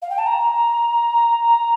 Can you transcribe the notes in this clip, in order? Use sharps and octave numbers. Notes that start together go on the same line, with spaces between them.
F5
G5
A5
A#5